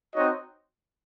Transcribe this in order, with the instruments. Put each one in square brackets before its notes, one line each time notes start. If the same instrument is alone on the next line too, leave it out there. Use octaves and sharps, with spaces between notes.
[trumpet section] C4 D#4 F#4 C#5 D#5